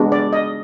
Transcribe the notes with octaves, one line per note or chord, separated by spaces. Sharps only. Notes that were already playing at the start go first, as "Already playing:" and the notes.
Already playing: G#3 B3 D4 F#4
D5
D#5